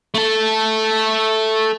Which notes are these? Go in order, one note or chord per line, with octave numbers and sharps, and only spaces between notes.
A3 A4